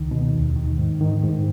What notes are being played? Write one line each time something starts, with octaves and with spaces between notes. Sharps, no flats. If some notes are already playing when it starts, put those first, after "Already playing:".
Already playing: C#2 D#3
B2
D#2
D#3
G#2
D#3
G#2